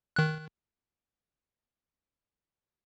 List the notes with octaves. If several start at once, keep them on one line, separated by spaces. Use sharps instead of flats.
D#3 F#6